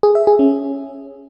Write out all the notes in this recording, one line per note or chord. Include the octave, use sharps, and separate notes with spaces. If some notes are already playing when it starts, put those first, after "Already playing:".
G#4
E5
G#4
C#4